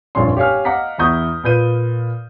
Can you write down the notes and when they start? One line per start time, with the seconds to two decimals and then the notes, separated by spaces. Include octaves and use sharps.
0.15 F1 A#1 G2 A#2 C#4 C6
0.37 G4 C#5 F5 G#5 F6
0.65 D#5 F5 F#5 A#5 D6 B6
0.98 E2 E4 A#5 C#6 D#6 G6
1.44 A#2 B4 G6 D#7